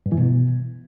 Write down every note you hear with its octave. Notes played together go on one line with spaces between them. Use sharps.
G2
E3
B2